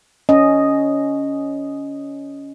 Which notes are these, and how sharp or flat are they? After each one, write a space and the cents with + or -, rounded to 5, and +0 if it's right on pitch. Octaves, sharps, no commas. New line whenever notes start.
C#4 +15 D#5 +0